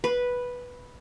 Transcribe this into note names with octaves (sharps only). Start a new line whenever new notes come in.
B4